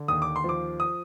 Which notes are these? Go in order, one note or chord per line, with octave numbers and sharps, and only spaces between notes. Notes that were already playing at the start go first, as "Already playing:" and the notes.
Already playing: D3
D#2 D#6
D6
C6
F3 D6
D#6